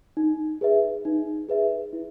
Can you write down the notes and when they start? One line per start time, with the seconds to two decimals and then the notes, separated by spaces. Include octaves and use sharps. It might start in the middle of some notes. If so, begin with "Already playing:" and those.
0.17 D#4
0.61 G#4 B4 E5
1.05 D#4
1.49 G#4 B4 E5
1.93 E4